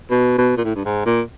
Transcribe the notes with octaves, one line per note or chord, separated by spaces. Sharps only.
B2
B2
A#2
A2
G2
G#2
A#2